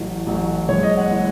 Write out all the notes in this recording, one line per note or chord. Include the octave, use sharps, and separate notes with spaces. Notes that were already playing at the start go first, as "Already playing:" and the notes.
Already playing: A1 A2 F#3 A3
A1 A2 F#3 A3
F#1 F#2 E3 G#3 C#5
D#5
F#5
E3 G#3